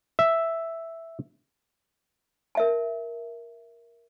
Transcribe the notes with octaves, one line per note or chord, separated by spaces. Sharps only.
E5
A#4 E5 A5